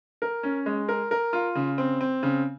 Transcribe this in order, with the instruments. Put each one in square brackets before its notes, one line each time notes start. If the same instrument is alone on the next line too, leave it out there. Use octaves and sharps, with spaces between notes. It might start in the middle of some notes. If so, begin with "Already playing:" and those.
[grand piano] A#4
C#4
G#3
A#4
A#4
F4
C#3
C4
C4
C#3